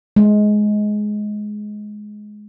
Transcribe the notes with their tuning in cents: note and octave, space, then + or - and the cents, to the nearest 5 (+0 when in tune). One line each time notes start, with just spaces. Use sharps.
G#3 +15